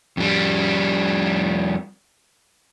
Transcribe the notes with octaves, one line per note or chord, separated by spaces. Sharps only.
F2 G3